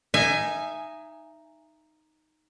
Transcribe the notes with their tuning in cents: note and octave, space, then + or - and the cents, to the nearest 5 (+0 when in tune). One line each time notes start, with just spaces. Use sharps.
D#4 +0 E5 +25 G#5 +0